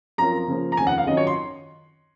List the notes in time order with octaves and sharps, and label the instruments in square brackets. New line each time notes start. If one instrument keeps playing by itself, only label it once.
[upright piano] F#2 F3 C4 F4 A#4 [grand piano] A#5
[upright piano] C#3 F3 A#3
[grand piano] A#5
[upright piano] F1 D#2 C#3 F3 [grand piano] G#5
[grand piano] F#5
F5
[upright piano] F#2 D#3 F#3 C#4 F4 [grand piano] D#5
[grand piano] C#5
C6